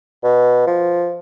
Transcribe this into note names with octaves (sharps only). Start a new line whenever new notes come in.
B2
F3